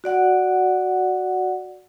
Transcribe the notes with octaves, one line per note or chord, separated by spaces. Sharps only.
F#4 D5 F#5